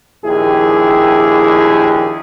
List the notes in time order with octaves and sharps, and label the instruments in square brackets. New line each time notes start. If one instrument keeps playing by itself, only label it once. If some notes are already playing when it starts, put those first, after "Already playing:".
[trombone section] A#1 D#2 E4 G4 G#4